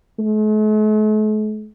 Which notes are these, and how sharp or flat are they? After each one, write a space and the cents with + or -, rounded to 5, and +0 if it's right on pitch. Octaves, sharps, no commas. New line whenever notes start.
A3 -45